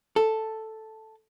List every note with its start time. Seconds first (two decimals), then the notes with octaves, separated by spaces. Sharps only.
0.16 A4